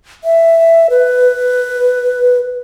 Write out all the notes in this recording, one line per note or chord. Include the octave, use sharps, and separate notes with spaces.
E5
B4